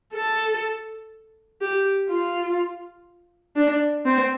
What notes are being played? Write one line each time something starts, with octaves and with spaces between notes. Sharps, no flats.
A4
G4
F4
D4
C4